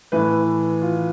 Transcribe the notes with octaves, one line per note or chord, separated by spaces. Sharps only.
A2 E3 B4
F4